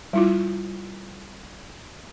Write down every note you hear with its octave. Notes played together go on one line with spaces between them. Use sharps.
G3 E4 F4